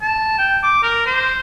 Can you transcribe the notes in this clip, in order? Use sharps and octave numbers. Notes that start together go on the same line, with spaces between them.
A5
G5
D6
A#4
C5